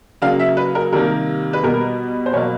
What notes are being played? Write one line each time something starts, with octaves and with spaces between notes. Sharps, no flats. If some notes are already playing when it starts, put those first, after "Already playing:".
C#3 F#3 A#3 F5
E5
B4
A#4
C3 D#3 G3 A#3 A#4
B4
B2 G3 B3 A#4
C5
B2 F#3 A#3 C#5